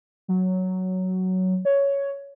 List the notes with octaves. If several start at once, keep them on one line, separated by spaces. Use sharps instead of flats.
F#3
C#5